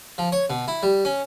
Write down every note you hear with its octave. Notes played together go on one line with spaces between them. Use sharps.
F3
C#5
B2
E4
G3
C#4